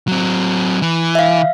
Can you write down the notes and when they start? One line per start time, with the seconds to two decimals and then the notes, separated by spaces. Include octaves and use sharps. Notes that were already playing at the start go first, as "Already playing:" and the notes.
0.08 F#3 C4
0.82 E3
1.15 E5 F5